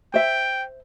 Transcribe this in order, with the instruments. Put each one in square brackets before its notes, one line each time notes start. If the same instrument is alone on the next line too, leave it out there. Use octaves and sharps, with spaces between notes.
[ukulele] C5 E5 [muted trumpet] G5